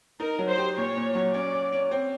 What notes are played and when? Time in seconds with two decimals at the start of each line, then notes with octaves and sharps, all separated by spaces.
0.20 D#4 A#4
0.39 F#3
0.49 C5
0.58 G4
0.77 A#2 C#5
0.96 A#2
1.15 F#3
1.34 C#4 D5
1.53 C#4
1.72 C#4
1.91 C4